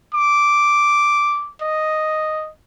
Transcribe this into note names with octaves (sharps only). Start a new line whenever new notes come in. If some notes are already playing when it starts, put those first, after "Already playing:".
D6
D#5